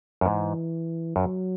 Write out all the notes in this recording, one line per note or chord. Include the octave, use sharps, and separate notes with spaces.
F#2
G#2 E3
F#2 F#3